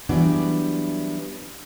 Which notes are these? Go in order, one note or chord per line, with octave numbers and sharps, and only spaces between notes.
E3 F#3 G3 B3 D4 D5